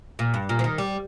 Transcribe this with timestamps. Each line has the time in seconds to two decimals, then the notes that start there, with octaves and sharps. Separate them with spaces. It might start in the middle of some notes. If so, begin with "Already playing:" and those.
0.19 A#2
0.34 G2
0.49 A#2
0.59 F3
0.64 D#3
0.78 G3